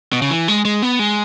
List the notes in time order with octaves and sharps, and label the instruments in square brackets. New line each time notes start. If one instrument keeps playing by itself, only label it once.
[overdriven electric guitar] B2
C#3
E3
G#3
G#3
B3
G#3